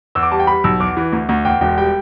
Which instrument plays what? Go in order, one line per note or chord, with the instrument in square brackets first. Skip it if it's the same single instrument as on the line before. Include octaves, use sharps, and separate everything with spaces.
[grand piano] E2 E6
D6
G3 A5
G5
G3 B5
B1 E6
E2 D6
E3
D2
D2
E2 G5
E1 G5
G3 G5